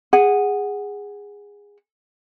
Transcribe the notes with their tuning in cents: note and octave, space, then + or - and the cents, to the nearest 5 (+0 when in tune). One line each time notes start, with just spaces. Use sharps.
G#4 -15 F#5 +0